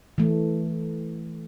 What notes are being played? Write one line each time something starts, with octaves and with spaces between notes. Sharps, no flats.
E3 A3